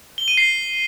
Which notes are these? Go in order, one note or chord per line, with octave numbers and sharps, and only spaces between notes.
G7
D#7
C7